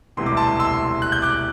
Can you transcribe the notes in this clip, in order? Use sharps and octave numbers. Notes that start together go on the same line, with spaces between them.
E1 D2 C3 E3 G3 C6
D6
A5 C6
C6 E6
F#6
G6
D6 F#6